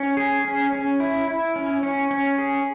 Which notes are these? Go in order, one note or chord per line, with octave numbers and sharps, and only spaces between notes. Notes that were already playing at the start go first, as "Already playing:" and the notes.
Already playing: C#4
G#4
C#4
C#4
E4
E4
C#4
C#4
C#4
G#4